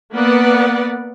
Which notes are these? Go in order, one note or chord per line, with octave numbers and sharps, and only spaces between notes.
A#3 B3 B4 D5 F#5